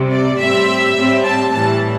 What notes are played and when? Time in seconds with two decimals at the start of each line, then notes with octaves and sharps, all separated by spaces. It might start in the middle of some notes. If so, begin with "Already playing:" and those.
Already playing: C3 G3 C4
0.10 D5
0.38 A2 G3 C4 E5
0.95 A2 G3 C4
1.23 A5
1.51 A2 E3 G3 A5